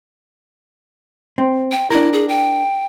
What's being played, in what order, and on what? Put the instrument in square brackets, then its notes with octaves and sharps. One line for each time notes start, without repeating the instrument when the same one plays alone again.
[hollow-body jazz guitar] C4
[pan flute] G5
[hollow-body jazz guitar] D4 A#4 [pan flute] E4
[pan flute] G#4
G5